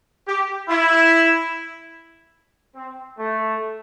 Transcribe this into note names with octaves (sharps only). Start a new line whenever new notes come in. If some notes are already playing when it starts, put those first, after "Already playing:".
G4
E4
C4
A3